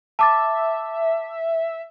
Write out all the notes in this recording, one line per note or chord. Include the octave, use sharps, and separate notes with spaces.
E5 A5 D6 A6